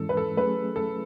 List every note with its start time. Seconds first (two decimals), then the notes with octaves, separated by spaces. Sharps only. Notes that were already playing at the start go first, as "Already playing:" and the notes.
Already playing: G#2 E3 G#3 C#4 E4 A4
0.09 B4
0.17 A4
0.37 F#3 A3 C#4 G#4 B4
0.76 A4